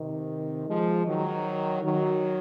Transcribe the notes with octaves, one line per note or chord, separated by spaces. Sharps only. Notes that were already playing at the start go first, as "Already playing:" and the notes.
Already playing: C3 D#3
F3 G#3
D#3 F#3
D#3 F#3